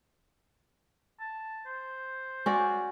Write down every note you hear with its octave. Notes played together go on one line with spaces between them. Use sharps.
A5
C5
C#4 F#4 D5